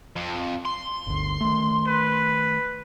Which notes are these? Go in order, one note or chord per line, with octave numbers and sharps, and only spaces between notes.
F2
C6
G1 D2
D#3 A3
B4